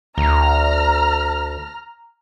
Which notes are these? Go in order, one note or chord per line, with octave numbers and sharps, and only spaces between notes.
D2 A#5 F6